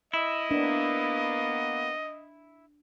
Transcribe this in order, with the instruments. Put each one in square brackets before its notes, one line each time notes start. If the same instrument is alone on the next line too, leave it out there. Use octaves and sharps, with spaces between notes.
[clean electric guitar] E4 [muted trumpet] D#5
[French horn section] A#3 B3 [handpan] D4